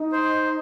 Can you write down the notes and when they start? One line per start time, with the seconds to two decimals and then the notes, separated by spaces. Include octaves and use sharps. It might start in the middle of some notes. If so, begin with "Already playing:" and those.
Already playing: D#4
0.12 C5